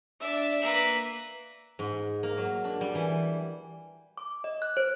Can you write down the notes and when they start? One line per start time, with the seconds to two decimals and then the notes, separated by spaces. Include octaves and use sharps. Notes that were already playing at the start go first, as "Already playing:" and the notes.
0.20 D4 D5 E5
0.61 A#3 B4
1.79 G#2
2.23 A#3
2.38 F#3
2.64 D4
2.81 G3
2.95 E3
4.18 D6
4.44 D#5
4.62 F#6
4.77 C5